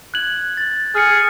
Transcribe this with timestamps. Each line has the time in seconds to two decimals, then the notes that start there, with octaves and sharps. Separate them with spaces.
0.14 F#6 G#6 F#7
0.57 A6
0.95 G#4 F6 C#7